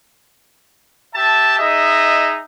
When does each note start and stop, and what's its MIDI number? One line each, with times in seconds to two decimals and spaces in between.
1.14 1.56 67
1.14 1.56 76
1.14 1.56 81
1.59 2.40 63
1.59 2.40 68
1.59 2.40 75
1.59 2.40 76